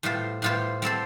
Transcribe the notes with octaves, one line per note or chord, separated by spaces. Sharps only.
A2 G3 F4 C5
A2 G3 F4 C5
G3 C4 A4 C5